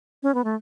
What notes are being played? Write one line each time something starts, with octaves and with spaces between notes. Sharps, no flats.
C#4
B3
A3